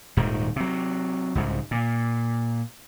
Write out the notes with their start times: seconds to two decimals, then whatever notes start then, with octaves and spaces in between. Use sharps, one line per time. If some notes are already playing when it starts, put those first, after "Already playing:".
0.17 D#1 G#2 D#3
0.56 C3 F#3
1.35 C2 G#2 C#3
1.71 A#2